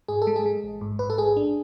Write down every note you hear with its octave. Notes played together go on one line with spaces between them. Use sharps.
G#2 G#4
A4
G#3
G#4
G#3
A1
G#2
G#2 B4
A4
A1 G#4
D4